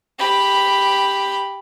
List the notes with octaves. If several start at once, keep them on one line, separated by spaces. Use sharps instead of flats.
G4 B5